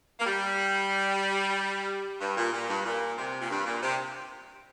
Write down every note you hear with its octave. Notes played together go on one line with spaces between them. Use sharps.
A#3
G3
G2
A#2
A#2
G2
A#2
C3
A#2
G2
A#2
C3